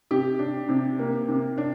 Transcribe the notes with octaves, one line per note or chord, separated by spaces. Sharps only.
C3 G4
D4
C3
A#3
C3
D4